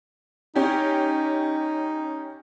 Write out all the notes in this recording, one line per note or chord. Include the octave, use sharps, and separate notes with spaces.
C#4 D#4 G4